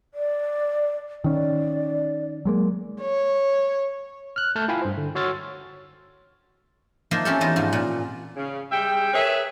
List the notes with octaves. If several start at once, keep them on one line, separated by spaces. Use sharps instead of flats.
D5
D#3 C#4 D5
F#3 G#3 A#3
C#5
F6 F#6
A3 A5 F6 G6
E4 F4 F5 G5 G#5 B5
G2 C5
D3
F#4 C#5 C6 E6 F6 A6
F3 A#3 D#4 F4 C5 E5
A#3 C4 C#4 F4 G4 A4
E2 D#4 F4
G#2 F3
A#2
C#3
G3 G#3 E5 G5
G#4 A#4 B4 C#5 E5